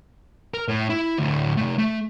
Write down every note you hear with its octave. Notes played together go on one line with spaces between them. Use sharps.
A#4
A2
E4
D2 A2
C3 A3
A3